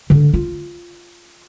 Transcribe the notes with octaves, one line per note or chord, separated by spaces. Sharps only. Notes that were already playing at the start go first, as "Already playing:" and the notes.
D3
F4